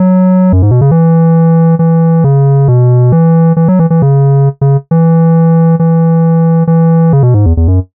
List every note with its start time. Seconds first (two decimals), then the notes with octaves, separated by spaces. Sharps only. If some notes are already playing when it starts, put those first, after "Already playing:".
Already playing: F#3
0.53 F#2
0.62 G#2
0.71 B2
0.81 C#3
0.91 E3
1.79 E3
2.24 C#3
2.68 B2
3.12 E3
3.57 E3
3.68 F#3
3.79 E3
3.90 E3
4.02 C#3
4.61 C#3
4.91 E3
5.79 E3
6.67 E3
7.13 C#3
7.23 B2
7.34 G#2
7.46 E2
7.57 E2
7.68 F#2